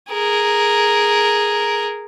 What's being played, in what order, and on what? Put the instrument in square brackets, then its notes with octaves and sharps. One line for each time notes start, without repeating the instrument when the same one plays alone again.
[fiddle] G#4 A#4